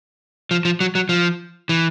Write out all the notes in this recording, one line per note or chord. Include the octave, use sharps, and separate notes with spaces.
F3
F3
F#3
F#3
F3
E3